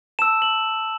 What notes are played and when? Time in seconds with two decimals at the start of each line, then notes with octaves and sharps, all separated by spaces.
0.19 A5 E6 E7
0.42 F#7